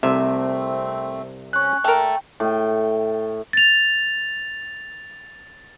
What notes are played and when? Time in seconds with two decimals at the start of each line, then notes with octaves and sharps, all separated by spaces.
0.03 C2 C3 A3 C4 E5
1.53 C#4 C#6 F#6
1.84 A#2 A3 A#4 G5
2.40 A2 G5
3.53 A6 F7